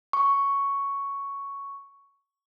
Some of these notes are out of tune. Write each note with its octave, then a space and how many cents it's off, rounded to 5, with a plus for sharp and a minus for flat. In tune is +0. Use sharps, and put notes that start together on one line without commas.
C#6 +5